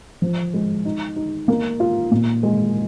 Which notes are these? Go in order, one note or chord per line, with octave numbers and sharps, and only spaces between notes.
F3
G#3
D#4
D#4
A#3
F4
A#2
G#3